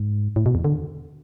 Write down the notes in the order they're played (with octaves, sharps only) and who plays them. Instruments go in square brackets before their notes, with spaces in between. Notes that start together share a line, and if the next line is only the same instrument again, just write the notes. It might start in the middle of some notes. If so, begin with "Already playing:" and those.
Already playing: [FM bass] G#2
A2
B2
E2
D3